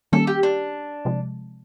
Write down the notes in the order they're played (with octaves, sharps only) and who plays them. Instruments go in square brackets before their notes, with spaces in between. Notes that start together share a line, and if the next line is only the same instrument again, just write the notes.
[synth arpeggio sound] D#3 G3 A#3 C#4 [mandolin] A4
[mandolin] G4
D4
[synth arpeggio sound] C3 F3 G#3